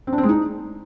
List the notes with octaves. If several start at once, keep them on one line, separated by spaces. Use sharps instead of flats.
C4
D4
C4
G#3
D#4